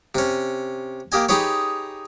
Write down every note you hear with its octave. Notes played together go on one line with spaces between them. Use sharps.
C3 C#4
A#3 G4 D#5 G#5
D#4 G4 G#4 B4 C#5